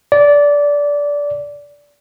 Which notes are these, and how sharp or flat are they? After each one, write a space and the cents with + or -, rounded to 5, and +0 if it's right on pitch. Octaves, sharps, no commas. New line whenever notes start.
D5 -20